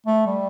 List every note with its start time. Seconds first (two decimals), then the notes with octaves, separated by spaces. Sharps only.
0.07 A3
0.26 G3